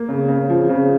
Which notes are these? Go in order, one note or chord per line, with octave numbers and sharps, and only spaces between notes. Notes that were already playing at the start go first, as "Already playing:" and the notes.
Already playing: A#3
C#3
C#3
F3
C#3